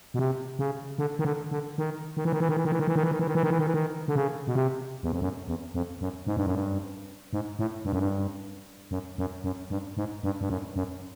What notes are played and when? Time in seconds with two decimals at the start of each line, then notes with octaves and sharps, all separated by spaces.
0.14 B2
0.19 C3
0.59 C#3
0.98 D3
1.19 D#3
1.25 D3
1.51 D3
1.78 D#3
2.17 D#3
2.25 E3
2.33 D#3
2.40 E3
2.49 D#3
2.57 E3
2.65 D#3
2.72 E3
2.79 D#3
2.87 E3
2.96 D#3
3.03 E3
3.11 D#3
3.19 E3
3.27 D#3
3.35 E3
3.43 D#3
3.50 E3
3.59 D#3
3.67 E3
3.74 D#3
4.08 D3
4.15 C#3
4.47 B2
4.55 C3
5.03 E2
5.12 F2
5.21 F#2
5.48 E2
5.74 F2
6.01 F#2
6.27 G#2
6.37 G2
6.46 F#2
6.55 G2
7.33 G#2
7.59 A2
7.85 G2
7.93 F#2
7.99 G2
8.91 F#2
9.18 F#2
9.44 F#2
9.70 G2
9.97 G#2
10.23 G2
10.41 G2
10.50 F#2
10.76 F#2